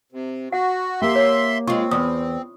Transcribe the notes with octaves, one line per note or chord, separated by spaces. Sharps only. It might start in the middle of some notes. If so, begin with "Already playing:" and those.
C3
F#4 F#5
A#3 G4 E5 G5 C6
C#5
G#3 C4 F4 C#6
E2 D#6